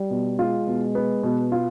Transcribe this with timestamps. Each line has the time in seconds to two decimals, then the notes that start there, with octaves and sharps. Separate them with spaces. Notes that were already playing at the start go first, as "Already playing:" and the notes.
Already playing: G3
0.10 B2
0.39 G#3 F4
0.67 B2
0.95 B3
1.23 B2
1.52 F4